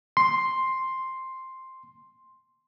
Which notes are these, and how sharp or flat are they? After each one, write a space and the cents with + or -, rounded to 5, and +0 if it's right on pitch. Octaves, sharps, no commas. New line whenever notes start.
C6 +5